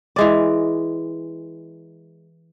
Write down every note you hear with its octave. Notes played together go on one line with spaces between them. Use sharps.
E3 G#3 D5